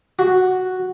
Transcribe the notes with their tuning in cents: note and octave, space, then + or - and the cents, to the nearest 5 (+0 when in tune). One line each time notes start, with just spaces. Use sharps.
F#4 +0